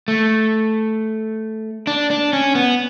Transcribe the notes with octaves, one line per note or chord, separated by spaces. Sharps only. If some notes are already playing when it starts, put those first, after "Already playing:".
A3
D4
D4
C#4
B3